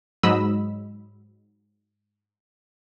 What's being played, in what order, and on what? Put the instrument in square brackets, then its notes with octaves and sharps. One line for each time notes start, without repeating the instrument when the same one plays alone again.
[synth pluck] G#2 F#3 D#5 B5 E6